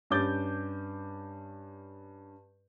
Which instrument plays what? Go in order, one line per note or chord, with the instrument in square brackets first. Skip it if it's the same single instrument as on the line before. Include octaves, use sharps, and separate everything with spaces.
[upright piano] G2 C#4 D6 G6 A6